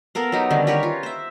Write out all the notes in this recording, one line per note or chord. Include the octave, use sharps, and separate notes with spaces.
B3 A4 A#4 F5
F#3 D#4 G4
D3 D#3 G3 C#4
G4 A#4 B4 C#5
F4
C5 E5